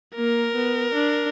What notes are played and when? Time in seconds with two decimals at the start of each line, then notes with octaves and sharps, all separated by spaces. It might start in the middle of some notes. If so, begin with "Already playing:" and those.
0.15 A#3 A#4
0.55 B3
0.94 D4